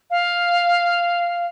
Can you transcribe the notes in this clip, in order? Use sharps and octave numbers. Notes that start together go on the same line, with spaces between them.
F5